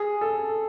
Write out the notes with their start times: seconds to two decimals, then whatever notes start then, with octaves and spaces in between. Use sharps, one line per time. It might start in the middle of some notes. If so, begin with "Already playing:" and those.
Already playing: G#4
0.21 A4